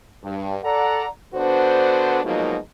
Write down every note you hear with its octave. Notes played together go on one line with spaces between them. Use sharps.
G2
A4 D5 F#5 A#5
D3 B3 D4 F#4 C5
B2 F3 F#3 G#3 A#3 D#4